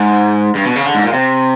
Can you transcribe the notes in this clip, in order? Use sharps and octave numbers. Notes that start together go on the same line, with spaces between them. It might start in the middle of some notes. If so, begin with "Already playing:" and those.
Already playing: G#2
G2
B2
C#3
D3
G#2
A#2
C3